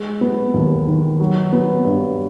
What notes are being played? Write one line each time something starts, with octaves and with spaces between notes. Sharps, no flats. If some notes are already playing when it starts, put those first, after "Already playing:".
Already playing: G#3
B3
D#2
D#3
F#3
B3
G2